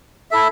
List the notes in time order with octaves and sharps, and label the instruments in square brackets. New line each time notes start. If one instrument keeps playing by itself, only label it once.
[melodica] E4 A4 E5